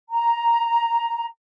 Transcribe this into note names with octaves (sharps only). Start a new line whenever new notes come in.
A#5